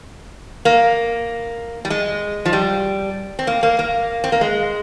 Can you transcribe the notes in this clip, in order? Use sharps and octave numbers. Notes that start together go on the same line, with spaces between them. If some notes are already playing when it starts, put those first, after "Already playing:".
A#3
G3
G#3
F3
G3
C4
A#3
A#3
A#3
C4
A#3
G#3